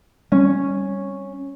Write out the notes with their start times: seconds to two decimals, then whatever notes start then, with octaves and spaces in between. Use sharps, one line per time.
0.32 G3 C4 C#4